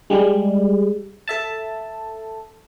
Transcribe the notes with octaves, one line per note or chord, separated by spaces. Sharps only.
G3 G#3
A4 E5 A5